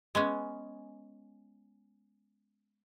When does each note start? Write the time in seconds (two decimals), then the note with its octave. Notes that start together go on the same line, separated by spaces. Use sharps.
0.15 G#3 B3 C#4